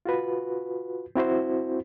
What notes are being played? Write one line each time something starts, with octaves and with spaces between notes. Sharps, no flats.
F4 F#4 B4
C4 E4 F#4 C5